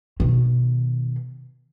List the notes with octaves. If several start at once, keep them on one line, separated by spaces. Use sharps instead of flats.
B2 D#3